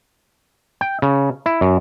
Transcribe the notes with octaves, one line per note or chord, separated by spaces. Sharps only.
G5
C#3
E4
F#2